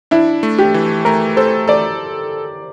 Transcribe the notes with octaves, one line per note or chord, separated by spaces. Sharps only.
D4 E4
A3
G4
E3
A3 A#4
A4 C5
A4 D5